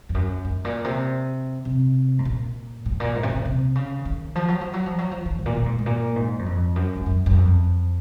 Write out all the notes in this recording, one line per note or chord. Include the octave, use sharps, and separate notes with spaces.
F2
F#2
G#2
A#2
C3
C3
G#2
A#2
G#2
A#2
G#2
C3
A#2
C3
C#3
D#3
F3
F#3
F3
F#3
F3
F#3
F3
D#3
G#2
A#2
A#2
G#2
G#2
A#2
G#2
F#2
F2
F#2
G#2
F#2
F#2
F2